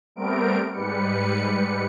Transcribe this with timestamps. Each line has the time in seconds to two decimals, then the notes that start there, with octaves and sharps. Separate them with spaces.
0.16 G3 A3 B3 C4 A#4 D7
0.73 G#2 G3 B4 C#7